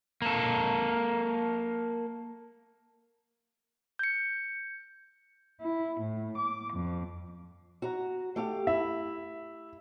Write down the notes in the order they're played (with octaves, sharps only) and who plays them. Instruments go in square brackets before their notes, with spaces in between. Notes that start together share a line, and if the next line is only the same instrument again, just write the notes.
[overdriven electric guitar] A#3 A4
[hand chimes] G6 C#7
[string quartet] E4
A2
D6
F2
[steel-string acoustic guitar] F#4 A#5
A3 G4 F5
[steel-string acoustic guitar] E4 [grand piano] E5